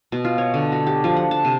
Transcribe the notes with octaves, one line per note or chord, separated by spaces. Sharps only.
B2
F4
C#5
D3
F#4
G4
F3
F#5
A5
C3